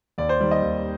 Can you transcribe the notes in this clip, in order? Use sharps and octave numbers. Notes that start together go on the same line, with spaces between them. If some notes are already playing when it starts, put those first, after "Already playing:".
D#2 D5
C5
D#3 G3 D5
D#5
D#2